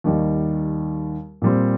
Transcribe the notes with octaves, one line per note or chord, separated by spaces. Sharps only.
D#2 D#3 G3
A#2 G3 C4